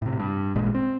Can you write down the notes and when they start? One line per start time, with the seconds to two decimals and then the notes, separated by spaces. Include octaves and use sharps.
0.02 A2 C3
0.20 G2
0.55 A1 A#2 G#3
0.75 C4